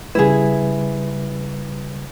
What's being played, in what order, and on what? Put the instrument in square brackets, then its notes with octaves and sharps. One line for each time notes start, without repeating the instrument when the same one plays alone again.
[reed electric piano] C#3 G3 B4 [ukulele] E4 G#4